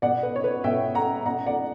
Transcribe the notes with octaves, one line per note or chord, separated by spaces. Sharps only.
B2 D5 F#5
B4
C#5
B4
B2 E5 G5
F#5 A#5
B2 F#5 A#5
D5 F#5